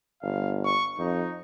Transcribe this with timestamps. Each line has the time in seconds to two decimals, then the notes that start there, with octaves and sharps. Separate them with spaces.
0.22 G1 F5
0.65 C#6
0.98 F2 D#4